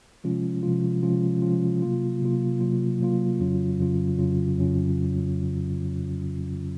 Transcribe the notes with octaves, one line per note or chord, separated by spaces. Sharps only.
C3 F3 G#3 C#4 F4
C3 F3 G#3 C#4 F4
C3 F3 G#3 C#4 F4
C3 F3 G#3 C#4 F4
C3 F#3 A#3 F4
C3 F#3 A#3 F4
C3 F#3 A#3 F4
C3 F#3 A#3 F4
F2 C#3 F#3 C#4 F4
F2 C#3 F#3 C#4 F4
F2 C#3 F#3 C#4 F4
F2 C#3 F#3 C#4 F4